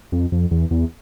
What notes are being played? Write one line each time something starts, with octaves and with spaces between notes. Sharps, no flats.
F2
F2
E2
E2